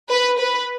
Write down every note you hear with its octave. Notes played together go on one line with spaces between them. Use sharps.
B4
B4